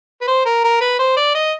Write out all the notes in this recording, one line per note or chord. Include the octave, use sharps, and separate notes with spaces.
B4
C5
A#4
A#4
B4
C5
D5
D#5